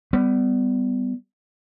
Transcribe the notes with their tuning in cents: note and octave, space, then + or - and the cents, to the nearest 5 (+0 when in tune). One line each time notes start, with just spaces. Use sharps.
G3 +0 B3 +25